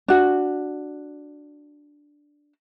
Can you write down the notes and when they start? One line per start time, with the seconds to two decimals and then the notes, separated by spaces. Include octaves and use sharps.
0.08 D4 F#4